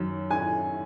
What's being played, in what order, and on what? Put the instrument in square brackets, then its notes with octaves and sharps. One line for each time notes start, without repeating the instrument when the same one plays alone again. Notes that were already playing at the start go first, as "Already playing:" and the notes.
Already playing: [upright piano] F#2 D#3 F#3
G#5